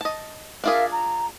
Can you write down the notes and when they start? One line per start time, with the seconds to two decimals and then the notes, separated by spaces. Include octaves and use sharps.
0.01 D#5 A5
0.64 D4 F4 G#4 A#4 E5 F5
0.90 A#5